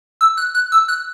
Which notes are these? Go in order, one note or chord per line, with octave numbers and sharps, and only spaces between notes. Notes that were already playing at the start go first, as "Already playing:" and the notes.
E6
F#6
F#6
E6
F#6